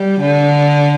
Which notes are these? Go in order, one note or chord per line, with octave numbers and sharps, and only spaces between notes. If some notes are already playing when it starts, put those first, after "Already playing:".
Already playing: G3
D3